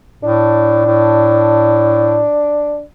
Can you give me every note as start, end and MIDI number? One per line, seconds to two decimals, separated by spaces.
0.23 0.84 45
0.23 2.82 62
0.85 2.24 45